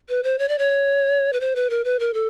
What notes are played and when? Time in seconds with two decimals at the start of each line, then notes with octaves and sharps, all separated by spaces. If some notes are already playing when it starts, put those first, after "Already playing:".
0.09 B4
0.23 C5
0.39 C#5
0.49 D5
0.58 C#5
1.33 B4
1.40 C5
1.56 B4
1.70 A#4
1.84 B4
1.99 A#4
2.14 A4